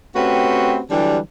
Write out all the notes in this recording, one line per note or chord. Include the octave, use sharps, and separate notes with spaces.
A3 C4 C#4 F#4 G4 B4
D3 E3 F#3 G3